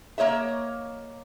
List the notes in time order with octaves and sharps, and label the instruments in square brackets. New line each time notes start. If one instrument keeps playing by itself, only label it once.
[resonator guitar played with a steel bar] A#3 C#5 D#5 E5